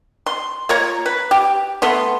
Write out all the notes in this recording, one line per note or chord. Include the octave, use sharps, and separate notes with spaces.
C6
A#3 F4 C#5 A#5
B4
G4
A3 B3 C6